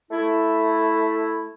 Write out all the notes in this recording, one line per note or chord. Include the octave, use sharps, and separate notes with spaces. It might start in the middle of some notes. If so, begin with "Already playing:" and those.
A3 E4